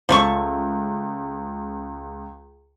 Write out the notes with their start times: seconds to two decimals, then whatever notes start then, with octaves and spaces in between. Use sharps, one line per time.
0.09 C#2 F3 A3 C#6